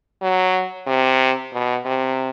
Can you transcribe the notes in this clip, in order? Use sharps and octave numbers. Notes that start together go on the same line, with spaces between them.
F#3
C3
B2
C3